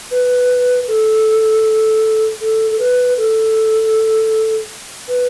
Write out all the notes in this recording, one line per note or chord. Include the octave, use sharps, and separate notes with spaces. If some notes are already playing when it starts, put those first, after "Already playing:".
B4
A4
A4
A4
B4
A4
B4